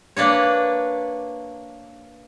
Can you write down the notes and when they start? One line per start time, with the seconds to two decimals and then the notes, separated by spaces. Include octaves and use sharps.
0.17 A#3 D4 B4 C#5